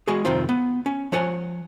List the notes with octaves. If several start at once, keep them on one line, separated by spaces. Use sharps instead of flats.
G#3 F#4 G#4
C2 F2 D#3 C4 F4
B3
C#4
F3 C#5 F#5 G#5